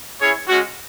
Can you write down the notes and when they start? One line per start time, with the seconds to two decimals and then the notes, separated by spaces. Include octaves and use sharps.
0.20 C#4 E4 G#4 C#5
0.48 G#3 C#4 F#4